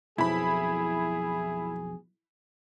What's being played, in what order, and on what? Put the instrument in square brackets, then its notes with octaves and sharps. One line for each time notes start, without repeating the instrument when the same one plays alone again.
[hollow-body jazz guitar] B1 F2 [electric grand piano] E4 B5 [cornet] G#4